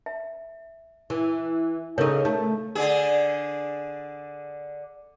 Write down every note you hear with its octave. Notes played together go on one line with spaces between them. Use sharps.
E5
E3
C#3 D#4 A4 A#4 C#5
A3 C#5
D3 D4 G#4